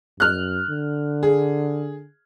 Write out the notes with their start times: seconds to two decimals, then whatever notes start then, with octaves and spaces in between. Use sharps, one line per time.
0.20 F#2 F6 F#6
0.70 D3
1.23 G#4